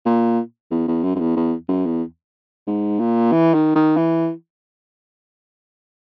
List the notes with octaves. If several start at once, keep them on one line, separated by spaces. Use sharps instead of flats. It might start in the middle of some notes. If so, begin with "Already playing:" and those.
A#2
E2
E2
F#2
F#2
E2
E2
F#2
E2
G#2
A#2
E3
D#3
D#3
E3